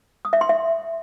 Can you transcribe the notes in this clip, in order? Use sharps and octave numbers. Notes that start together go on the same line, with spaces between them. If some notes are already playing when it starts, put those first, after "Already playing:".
D#6
E5
C6
E5